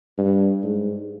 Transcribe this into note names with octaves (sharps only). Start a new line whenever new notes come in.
G2
G#2